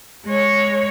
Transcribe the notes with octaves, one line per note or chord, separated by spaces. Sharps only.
G#3 C#5